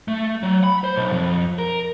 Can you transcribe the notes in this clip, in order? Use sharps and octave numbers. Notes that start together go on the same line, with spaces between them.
A3
F#3
B5
C5
B1
F2
A#4